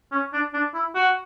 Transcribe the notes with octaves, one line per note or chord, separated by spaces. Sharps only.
C#4
D4
D4
E4
F#4